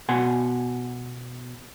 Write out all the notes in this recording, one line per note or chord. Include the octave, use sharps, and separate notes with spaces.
B2 F#5 G#5 C6